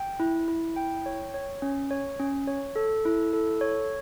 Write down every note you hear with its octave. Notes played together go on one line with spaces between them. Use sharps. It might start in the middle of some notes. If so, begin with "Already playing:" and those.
Already playing: G5
E4
E4
G5
C#5
C#5
C#4
C#5
C#4
C#5
A4
E4
A4
C#5